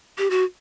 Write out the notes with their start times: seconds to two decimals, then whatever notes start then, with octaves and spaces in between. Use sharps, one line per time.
0.18 G4
0.30 F#4